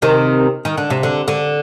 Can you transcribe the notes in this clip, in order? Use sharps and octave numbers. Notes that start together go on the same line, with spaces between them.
C3 D#3
D#3
D3
C3
D3
D3